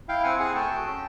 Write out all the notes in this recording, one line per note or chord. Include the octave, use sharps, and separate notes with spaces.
E4 F5 G5
C4 F#5 G#5
G#4 F#5 G#5
A3 G5 A5
F#4
C#4